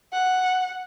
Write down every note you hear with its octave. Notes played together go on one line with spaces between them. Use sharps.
F#5